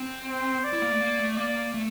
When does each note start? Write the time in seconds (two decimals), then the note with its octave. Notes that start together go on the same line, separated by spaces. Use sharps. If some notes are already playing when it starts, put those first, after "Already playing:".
Already playing: C4
0.28 C5
0.64 D5
0.73 E4
0.82 A#3
0.92 A3
1.01 A#3
1.19 A3
1.37 A#3 D5
1.74 A3